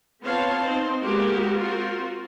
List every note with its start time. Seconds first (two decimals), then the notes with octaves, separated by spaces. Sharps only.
0.23 B3 C4 F4 C#5 F5 A5
0.61 C4 D#4 C5
1.02 G#3 A#3 B3 F#4 G4 A#4
1.60 C4 F4 F#4 A#4